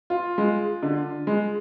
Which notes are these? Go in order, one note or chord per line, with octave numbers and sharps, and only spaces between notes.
F4
G#3
D3
G#3